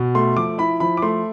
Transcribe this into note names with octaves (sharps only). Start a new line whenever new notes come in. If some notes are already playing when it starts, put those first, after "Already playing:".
Already playing: B2
A3 C6
F3 D6
E4 B5
F3 B5
D6
A3 C6